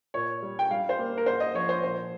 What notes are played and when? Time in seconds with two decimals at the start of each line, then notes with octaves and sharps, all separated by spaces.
0.14 A#2 C#5
0.42 G3
0.59 G5
0.70 G3 F5
0.89 C5
0.99 A#3
1.18 A#4
1.26 G#2 C5
1.40 D#5
1.55 F3 C#5
1.69 C5
1.83 A#2 C5